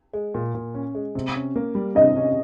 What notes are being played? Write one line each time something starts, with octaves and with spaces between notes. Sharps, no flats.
G#3
A#2
A#2
C#4
G#3
C3
C#4
A#3
G3
C3 D#5
C#4